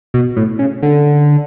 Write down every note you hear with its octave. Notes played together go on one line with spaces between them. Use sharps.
B2
A2
C#3
D3